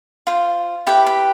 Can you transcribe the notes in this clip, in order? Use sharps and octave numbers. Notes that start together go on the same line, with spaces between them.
F4 C5
E4 G4 B4 G5
B5